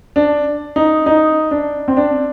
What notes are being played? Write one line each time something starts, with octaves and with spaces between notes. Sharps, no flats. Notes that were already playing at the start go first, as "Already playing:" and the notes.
D4
D#4
D#4
D4
C4
D4